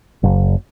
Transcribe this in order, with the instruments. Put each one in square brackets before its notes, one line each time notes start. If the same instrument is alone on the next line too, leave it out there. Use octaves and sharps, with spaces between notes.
[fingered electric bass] F#1